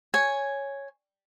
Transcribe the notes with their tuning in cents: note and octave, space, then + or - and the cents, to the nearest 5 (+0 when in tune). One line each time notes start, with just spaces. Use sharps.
C#5 +0 G#5 +0